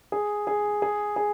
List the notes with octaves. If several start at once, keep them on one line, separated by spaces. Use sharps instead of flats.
G#4
G#4
G#4
G#4